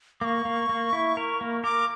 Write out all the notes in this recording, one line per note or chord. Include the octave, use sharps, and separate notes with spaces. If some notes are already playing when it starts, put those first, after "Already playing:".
A#3 C#6 D6
A#3
A#3
E4
A#4
A#3
A#4 D6